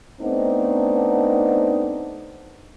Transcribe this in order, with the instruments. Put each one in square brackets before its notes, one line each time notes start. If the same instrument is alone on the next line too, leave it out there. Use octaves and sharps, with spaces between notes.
[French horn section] A3 B3 C4 D4 D#4